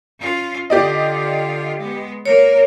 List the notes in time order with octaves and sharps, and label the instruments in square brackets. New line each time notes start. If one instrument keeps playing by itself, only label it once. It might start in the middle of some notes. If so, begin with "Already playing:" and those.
[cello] C#4 F4
[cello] D3 F4 [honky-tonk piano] G4 D5 D#5
[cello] G#3 B3
[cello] A#3 A#4 [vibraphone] C#5